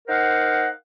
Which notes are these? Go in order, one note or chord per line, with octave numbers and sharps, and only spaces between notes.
D#4 A#4 C5 F5 F#5